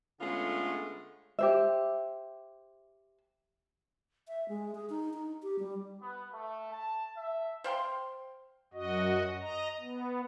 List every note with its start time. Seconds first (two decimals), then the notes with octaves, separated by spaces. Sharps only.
0.19 D3 G#3 A3 B3 C#4 F4
1.39 G4 C5 E5
4.28 E5
4.49 G#3
4.75 G#4
4.90 D#4
5.14 D#4
5.43 G4
5.59 G3
6.01 B3
6.33 A3
6.73 A5
7.16 E5
7.64 C5 F5 G5 C6
8.74 F#2 F#4 D#5
9.41 D#5 A#5
9.80 B3